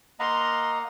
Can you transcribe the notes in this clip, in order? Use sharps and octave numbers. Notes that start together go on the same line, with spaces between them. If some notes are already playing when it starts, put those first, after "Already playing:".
A#3 D#5 F5 F#5 A#5 C6